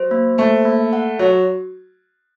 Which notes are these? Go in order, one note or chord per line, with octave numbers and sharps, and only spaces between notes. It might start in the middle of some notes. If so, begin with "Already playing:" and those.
Already playing: F#3 C5
A#3
A3 C5
A#3
F#5
F#3 F#4